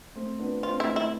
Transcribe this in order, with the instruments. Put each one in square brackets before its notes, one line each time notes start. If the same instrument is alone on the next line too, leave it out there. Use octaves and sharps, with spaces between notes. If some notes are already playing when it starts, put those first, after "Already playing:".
[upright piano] A3 C4
B3 D4
[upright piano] C4 [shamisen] F4
[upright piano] D4
[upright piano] A3 C4 [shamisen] E4
[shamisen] E4